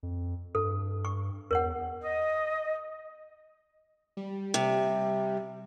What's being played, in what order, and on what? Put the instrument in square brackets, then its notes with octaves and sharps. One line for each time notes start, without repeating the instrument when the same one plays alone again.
[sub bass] F2
[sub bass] G2 [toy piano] A4
[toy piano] C#6
[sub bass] E2 [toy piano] A#4 C#5 F#5
[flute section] D#5
[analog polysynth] G3
[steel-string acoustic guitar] C3